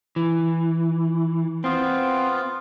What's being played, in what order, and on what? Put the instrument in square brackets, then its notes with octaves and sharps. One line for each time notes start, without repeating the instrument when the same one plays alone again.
[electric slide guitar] E3
[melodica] B3 F4 [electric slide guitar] C4